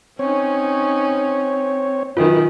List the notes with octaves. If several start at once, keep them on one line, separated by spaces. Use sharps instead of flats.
C4 C#4 D#4 C#5
F#2 D#3 F4 B4